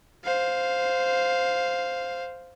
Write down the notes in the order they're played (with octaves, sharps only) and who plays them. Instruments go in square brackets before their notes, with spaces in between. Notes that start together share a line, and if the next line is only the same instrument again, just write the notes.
[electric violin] C5 F5